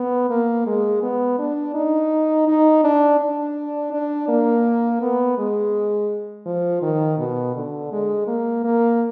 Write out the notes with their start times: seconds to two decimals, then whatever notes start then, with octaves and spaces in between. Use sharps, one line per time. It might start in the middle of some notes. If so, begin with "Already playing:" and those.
Already playing: B3
0.30 A#3
0.66 G#3
1.03 B3
1.39 D4
1.74 D#4
2.48 D#4
2.84 D4
3.20 D4
3.93 D4
4.28 A#3
5.02 B3
5.38 G#3
6.46 F3
6.82 D#3
7.19 B2
7.55 D3
7.92 G#3
8.27 A#3
8.64 A#3